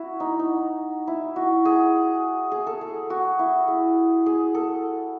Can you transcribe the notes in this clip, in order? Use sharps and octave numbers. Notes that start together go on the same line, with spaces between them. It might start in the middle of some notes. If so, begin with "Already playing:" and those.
Already playing: E4 F#4
D#4
D#4
E4
F#4
G#4
G#4
A4
G#4
F#4
E4
G#4
G#4
A4